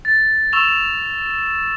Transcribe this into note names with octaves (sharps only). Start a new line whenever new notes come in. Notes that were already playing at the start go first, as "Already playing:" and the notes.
A6
C#6 E6 E7 F7